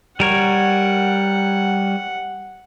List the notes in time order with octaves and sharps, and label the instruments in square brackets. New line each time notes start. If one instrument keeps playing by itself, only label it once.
[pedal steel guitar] G3 A#4 C#5 [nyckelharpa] F#5